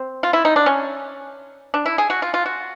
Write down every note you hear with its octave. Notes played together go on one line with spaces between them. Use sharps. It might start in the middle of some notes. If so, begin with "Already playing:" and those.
Already playing: C4
F4
E4
D#4
D4
C#4
D4
E4
G#4
F#4
F4
F4
F#4